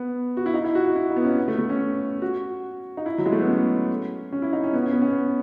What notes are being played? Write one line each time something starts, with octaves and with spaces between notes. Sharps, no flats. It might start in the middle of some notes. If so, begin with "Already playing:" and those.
Already playing: B3
F#4
E4
D#4
E4
F#4
F#4
E4
D#4
B3
C#4
B3
A3
A3
C#4
F#4
D#4
E4
F#3
G#3
A3
B3
C#4
C#4
E4
D#4
C#4
B3
C#4
B3
C#4
B3